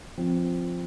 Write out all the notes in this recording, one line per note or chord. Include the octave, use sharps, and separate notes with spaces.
F3 C4